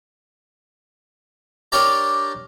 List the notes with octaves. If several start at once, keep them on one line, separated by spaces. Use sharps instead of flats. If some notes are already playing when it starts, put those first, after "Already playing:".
D4 G4 A#4 C#5 D5 A#5